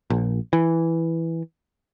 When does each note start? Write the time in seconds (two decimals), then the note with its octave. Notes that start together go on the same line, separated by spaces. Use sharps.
0.10 A#1
0.53 E3